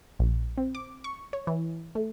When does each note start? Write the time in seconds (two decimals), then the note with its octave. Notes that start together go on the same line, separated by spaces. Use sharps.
0.19 A#1
0.58 C4
0.75 D6
1.04 C#6
1.33 C#5
1.47 E3
1.95 A3